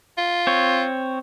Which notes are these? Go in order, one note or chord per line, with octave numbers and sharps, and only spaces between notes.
F4
C4 C#5